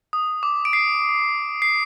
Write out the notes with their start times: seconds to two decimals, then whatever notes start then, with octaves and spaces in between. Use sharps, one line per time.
0.13 D#6
0.43 D6
0.65 D7
0.73 C7
1.62 C7